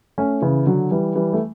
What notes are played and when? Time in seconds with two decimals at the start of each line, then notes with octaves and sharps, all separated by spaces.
0.18 A3 C#4
0.42 C#3 E3
0.66 D3 F#3
0.91 E3 G3
1.15 E3 G3
1.33 A3